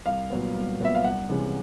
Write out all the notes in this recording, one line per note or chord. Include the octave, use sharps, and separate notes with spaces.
C2 F5
A#2 F#3 B3
C2
A#2 F#3 B3 E5
F5
C2 F#5
C3 E3 G#3 C#4